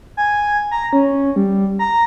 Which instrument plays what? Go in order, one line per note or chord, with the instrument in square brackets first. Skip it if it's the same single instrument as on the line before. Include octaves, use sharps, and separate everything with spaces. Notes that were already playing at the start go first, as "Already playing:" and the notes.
[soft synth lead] G#5
A#5
C#4
G3
A#5